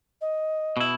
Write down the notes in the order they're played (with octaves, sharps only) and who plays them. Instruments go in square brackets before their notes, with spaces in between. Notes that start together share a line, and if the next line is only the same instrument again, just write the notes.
[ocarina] D#5
[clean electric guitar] B2 E4